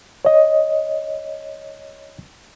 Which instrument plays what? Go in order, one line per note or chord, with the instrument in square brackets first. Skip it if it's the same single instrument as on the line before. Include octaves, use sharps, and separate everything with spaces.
[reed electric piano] C#5 D#5